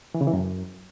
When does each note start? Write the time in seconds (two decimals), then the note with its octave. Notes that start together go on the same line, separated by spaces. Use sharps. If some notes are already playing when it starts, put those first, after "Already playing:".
0.14 E3
0.21 C#3
0.27 E3
0.33 F#2